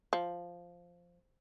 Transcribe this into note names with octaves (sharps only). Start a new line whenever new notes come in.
F3